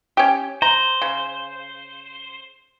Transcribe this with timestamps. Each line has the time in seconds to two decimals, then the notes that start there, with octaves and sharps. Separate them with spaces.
0.17 C#4 G4
0.62 C5 A#5
1.02 C#3